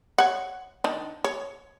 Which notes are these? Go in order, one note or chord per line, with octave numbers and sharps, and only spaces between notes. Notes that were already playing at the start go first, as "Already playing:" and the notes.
C#5 F#5
D#3 D4
C#5